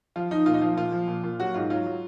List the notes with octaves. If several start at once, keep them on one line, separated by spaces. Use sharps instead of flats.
F3 F4
F3 D#4
A#2 F4
D#4
F3 F4
A#2 F4
F3
A#2
A#2
F#3 F#4
G#2 F4
F#3 F4
F#3